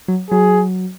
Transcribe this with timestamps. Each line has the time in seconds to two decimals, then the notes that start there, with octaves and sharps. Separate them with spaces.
0.08 F#3
0.30 F#3 G#4